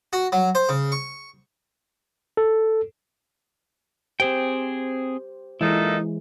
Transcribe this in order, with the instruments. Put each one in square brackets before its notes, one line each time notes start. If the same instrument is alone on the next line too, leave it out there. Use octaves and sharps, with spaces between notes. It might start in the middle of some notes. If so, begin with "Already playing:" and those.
[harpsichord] F#4
F#3
C5
C#3
C#6
[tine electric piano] A4
[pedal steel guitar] C4 G#4 G5 [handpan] G4 C5
[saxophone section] A#2 D#4 A4 [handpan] E3 G#3 [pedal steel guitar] E4